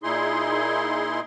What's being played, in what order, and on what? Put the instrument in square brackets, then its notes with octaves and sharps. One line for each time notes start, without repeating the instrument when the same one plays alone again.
[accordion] A#2 D#4 E4 G#4 C6